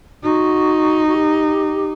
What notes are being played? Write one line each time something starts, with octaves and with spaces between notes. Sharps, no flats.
D#4 F#4
F#4
G4